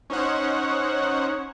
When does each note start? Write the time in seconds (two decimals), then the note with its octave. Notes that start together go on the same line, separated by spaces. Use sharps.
0.10 C#4 D#4 C5 C#5 F#5